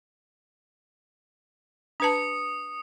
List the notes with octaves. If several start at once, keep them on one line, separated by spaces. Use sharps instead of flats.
D4 B4 A5 D#6 C#7